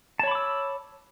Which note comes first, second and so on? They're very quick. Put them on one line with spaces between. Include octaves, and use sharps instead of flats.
A5 C#5 B5 D6 E6